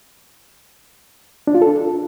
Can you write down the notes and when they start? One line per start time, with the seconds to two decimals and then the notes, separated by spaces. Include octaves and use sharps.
1.47 D4
1.55 F4
1.62 A4